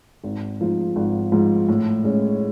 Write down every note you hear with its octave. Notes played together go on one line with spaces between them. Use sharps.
G#1
G#2 F3
G#1
G#2 F3
A2
G#3 C#4